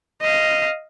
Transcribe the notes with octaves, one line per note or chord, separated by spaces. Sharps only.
D#5 F5